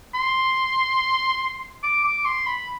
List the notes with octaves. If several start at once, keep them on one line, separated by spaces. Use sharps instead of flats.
C6
D6
D6
C6
B5